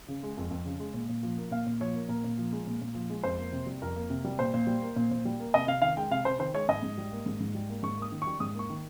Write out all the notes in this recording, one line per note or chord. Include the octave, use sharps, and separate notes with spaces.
C#3
G#3
F2
F2
C#3
G#3
A#2
A#2
F3
A#3
A#2 F5
A#2
F3 C#5
A#3
A#2 A#4
A#2
F3
G#3
A#2
A#2
F3
G#3
F2 C5
A#3
C3
G3
F2 A#4
A#3
C3
G3
A#2 C5
A#2
G3
A#3
A#2
A#2
G3
A#3
C3 D#5
C3 F5
D#3 F5
G#3 G5
C3 F5
C3 C5
D#3 C5
G#3 C#5
G#2 D#5
G#2
G3
A#3
G#2
G#2
G3
A#3
G#2 C#6
A#3 D#6
D#3
G3 C#6
G#2 D#6
A#3 C#6
D#3